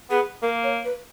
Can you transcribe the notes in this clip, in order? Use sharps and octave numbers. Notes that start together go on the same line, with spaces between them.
B3 G#4
A#3 A#4
C#5
B4